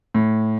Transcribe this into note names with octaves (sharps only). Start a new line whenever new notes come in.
A2